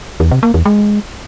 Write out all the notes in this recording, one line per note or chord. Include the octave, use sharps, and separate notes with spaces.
E2
C3
A#3
E2
G#3